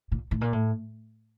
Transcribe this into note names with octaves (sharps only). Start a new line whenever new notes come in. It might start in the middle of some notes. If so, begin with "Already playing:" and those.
A#2
A2
A#2
A2